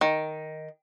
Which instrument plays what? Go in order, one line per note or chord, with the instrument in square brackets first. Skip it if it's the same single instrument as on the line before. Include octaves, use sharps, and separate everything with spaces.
[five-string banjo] D#3